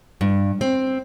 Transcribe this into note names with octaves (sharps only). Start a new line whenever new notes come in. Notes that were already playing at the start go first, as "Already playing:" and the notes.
G2
C4